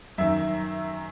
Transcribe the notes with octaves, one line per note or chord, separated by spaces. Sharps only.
F#2 D#3 E5